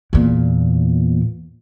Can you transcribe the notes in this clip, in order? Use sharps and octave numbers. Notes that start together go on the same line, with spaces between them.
E2 A#2